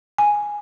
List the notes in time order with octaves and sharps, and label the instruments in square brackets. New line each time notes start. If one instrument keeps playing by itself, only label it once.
[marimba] G#5